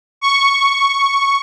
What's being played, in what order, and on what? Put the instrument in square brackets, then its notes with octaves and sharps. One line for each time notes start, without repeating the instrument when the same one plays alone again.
[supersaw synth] C#6